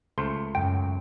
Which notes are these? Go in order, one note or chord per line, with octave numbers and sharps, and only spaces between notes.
C#2 A3 C5 C6
F#2 G5